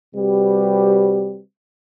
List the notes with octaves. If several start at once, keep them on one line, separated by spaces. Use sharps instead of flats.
C3 G3 C4 F#4 G4 B4